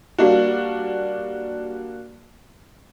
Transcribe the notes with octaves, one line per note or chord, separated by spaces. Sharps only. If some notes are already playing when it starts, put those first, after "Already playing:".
G3 A#3 D4 F#4